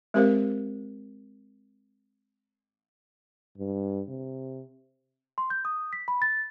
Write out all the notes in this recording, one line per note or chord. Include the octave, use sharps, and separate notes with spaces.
G#3 C4 G4 A#4 C5 F5
G2
C3
C6
G6
D#6
B6
B5
A6